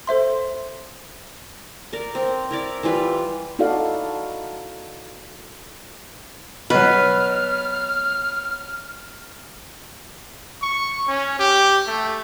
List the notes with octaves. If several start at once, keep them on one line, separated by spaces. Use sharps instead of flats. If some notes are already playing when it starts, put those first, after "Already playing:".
A4 C5 E5 C6
A#4 D5
C4
E4 A#4 D5
E3 G3 F4 B4
D#4 E4 F#4 A4 D5 F5
B2 F#3 B4 F6
C#6
C#4
G4
A3